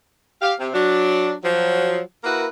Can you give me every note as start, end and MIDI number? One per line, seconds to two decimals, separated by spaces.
0.42 0.54 67
0.42 0.54 77
0.60 0.69 48
0.74 1.33 54
0.74 1.33 62
1.44 2.00 53
1.44 2.00 54
2.24 2.47 58
2.24 2.47 64
2.24 2.47 66
2.24 2.47 70
2.24 2.47 71